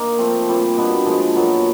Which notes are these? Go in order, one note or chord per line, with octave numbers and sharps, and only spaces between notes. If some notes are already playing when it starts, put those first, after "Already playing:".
Already playing: A#3 D#4
F3 A3 C4
A#2 G3 C4
B2 G3 B3 D4
A#2 F3 G#3
A#2 F#3 B3